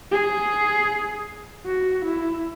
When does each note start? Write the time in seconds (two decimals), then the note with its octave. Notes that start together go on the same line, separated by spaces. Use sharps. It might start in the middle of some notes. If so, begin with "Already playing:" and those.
0.12 G#4
1.66 F#4
2.05 E4